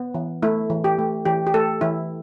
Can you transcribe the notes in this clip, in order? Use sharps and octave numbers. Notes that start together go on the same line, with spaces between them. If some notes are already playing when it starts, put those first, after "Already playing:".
Already playing: B3
E3
A3 E4
E3
G4
A3
E3 G4
G4
A3 A4
E3 E4